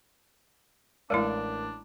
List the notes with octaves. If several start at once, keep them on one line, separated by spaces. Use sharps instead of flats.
A1 G#3 A3 D4 E4 A#4 D5